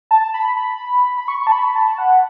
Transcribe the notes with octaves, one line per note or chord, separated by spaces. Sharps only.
A5
B5
B5
B5
C#6
A5
B5
A5
F#5